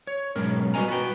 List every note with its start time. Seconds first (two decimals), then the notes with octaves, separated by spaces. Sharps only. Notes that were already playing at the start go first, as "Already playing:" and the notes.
0.07 C#5
0.36 B1 G#2 C#4 A#4
0.74 G3 F#4 B4 D#5 G#5 A#5
0.88 B3 F#4 G5